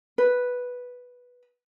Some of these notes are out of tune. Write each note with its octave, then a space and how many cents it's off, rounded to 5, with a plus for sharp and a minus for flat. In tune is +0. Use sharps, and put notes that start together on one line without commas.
B4 -5